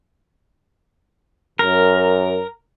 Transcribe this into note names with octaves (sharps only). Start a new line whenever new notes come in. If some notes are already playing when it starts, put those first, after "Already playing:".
F#2 A#4